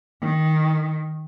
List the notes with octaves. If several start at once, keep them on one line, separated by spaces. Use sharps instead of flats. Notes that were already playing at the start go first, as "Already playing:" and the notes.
D#3